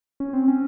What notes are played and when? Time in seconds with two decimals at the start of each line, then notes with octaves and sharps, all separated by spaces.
0.20 C#4
0.33 C4
0.48 C#4